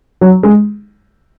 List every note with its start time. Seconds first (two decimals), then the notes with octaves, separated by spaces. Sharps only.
0.21 F#3
0.43 G#3